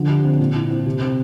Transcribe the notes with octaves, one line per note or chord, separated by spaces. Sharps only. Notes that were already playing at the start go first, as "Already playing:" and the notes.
Already playing: D3 F3
G4
C4
A#2
E4
C4
C3
C4